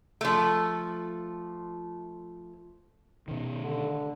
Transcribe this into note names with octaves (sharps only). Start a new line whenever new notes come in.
F3 A3
B2 D#3
D3